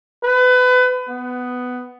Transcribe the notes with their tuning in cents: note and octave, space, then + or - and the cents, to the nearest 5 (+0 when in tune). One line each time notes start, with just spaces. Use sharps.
B4 +25
B3 +10